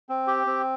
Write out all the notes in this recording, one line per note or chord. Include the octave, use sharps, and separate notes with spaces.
C4
G4
C4